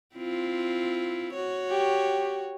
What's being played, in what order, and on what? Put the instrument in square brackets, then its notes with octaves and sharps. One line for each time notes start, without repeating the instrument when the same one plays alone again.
[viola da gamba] C4 E4 F4
F#4 C#5
[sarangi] G4